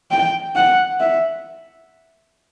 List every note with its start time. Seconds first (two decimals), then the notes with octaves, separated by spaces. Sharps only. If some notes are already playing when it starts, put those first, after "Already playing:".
0.11 G5
0.56 F#5
1.00 E5